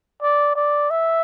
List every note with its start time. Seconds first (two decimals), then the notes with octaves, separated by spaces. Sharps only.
0.22 D5
0.56 D5
0.90 E5